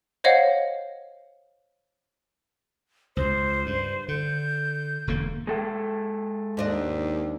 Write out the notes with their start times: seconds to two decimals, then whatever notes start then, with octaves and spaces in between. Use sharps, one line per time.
0.24 C5 C#5 D#5 F5 F#5
3.17 C#2 C5
3.66 G2
4.08 D3 G6
5.07 E1 D3 A#3
5.47 G#3 A4 G5
6.57 D#2 G#2 D4 D#5